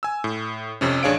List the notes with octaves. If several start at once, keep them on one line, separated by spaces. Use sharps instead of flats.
G#5 E6
A2
F2 C3 C#4
A1 D4 G#4 C#5 F5 D7